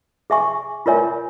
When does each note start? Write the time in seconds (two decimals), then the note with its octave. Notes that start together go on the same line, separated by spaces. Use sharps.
0.30 G#4 E5 G#5 C#6
0.86 F4 A#4 C#5 E5 G#5